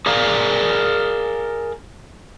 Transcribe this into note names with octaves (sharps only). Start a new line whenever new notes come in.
G#4 A#4 D5 F5 A#5